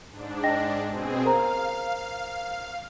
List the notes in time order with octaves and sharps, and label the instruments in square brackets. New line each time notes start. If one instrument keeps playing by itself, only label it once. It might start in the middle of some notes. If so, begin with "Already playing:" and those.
[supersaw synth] G#2 D4
[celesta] D#5 G5 A#6
[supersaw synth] B2 C4 G#4
[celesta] A#4 C5 A#5 [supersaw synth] F5